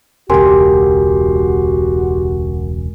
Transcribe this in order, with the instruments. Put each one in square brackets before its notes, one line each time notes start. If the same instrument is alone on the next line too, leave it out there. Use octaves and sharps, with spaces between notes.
[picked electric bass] E1 C#2 [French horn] F#4 [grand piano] G4 C6 [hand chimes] A#4 G#5